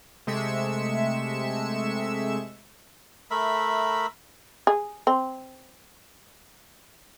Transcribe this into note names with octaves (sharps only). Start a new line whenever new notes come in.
C3 G#3 A3 E5 C#7 E7
A3 A#4 E5 B5
G#4
C4